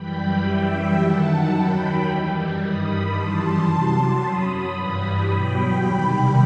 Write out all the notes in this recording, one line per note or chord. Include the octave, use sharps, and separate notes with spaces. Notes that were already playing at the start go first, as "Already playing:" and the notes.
Already playing: F#2 E3 G3 G5 B5
F#2 E3 G3 E5 G5
F#2 D#3 F#3 F#5 A5
D#2 D#3 F#3 G5 B5
F#2 E3 G3
G2 D#3 G3 B5 D#6
F#2 E3 G3 A5 C6
E2 C3 F#3
F#2 F#3 B5 D#6
G2 E3 G3 B5 D#6
E2 B2 F#3 G5 B5
E2 C3 D#3 G3 G5 B5